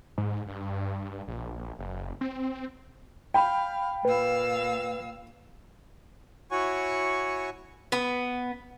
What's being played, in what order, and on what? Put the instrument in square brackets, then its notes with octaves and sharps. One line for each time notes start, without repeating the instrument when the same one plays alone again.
[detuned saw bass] G#2
G2
A#1
F#1
C4
[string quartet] F5 [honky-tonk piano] G5 B5
[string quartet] A#2 F5 E6 [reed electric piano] B4
[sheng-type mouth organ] E4 F#4 C#5 F#5 G#5 C#6
[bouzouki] B3